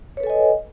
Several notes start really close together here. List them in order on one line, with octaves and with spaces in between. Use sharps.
C#5 B4 A4 G#5 D#5